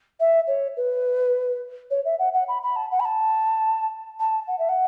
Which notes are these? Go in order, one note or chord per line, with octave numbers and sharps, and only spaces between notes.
E5
C#5
B4
C#5
E5
F#5
F#5
B5
B5
A5
F#5
B5
A5
A5
F#5
E5
F#5